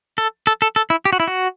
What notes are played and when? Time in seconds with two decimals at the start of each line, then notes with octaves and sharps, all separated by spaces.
0.18 A4
0.47 A4
0.62 A4
0.76 A4
0.90 E4
1.05 G4
1.13 F#4
1.20 E4
1.28 F#4